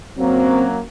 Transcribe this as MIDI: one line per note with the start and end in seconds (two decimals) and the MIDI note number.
0.19 0.80 42
0.19 0.80 54
0.19 0.80 58
0.19 0.66 60